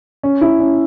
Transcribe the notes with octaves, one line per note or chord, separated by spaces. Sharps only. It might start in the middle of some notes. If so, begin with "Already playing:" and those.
C#4
E4
C#4